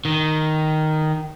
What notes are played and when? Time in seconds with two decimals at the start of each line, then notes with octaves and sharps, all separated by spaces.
0.05 D#3